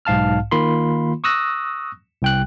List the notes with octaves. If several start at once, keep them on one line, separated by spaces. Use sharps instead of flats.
B1 G#2 F5 A5 F6
D#3 A#3 F4 B5 C6
C#6 D#6 E6 F#6 A#6
C2 G5 F#6